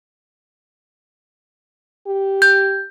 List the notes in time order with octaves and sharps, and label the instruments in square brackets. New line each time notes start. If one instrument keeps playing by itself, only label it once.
[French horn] G4
[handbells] G6